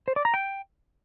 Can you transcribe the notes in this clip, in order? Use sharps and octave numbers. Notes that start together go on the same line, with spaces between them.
C5
D5
A#5
G5